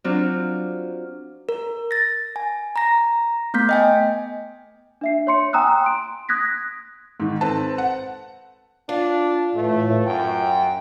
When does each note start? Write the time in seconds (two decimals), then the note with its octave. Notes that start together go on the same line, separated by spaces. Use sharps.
0.04 F#3 C4 D4 F4
1.49 A#4
1.91 A6 A#6
2.36 G#5
2.76 A#5 A#6
3.54 A3 B3 G6 B6
3.69 D#5 G5 G#5
5.01 D4 E5 C7
5.27 C#5 C6 C#7
5.53 G5 G#5 A#5 D#6 E6 F#6
5.84 C6 D7
6.29 D#6 F#6 G#6 A#6 B6
7.20 G#2 D#3
7.41 C4 A4 B4 A5
7.78 F#5
8.89 D4 F4
9.55 A2 E3 A3
10.06 F#2 G5